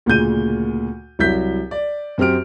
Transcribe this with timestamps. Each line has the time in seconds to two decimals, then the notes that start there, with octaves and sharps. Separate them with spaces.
0.06 D2 A#2 C#3 G6 D#7
1.19 C2 F#3 E4 G6 B6
1.71 D5
2.18 F#2 C4 G4 F6 D7